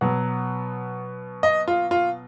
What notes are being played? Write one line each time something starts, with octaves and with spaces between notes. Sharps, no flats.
B2 F#3 B3 F#5
D#5
F4
F4